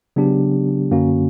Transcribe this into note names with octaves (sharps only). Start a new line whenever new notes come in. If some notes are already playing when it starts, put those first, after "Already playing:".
C#3 F#3 B3 D4 G4
F#2 D3 A#3 C#4 F#4